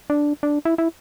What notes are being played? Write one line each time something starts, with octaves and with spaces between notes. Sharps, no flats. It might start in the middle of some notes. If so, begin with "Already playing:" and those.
D4
D4
E4
E4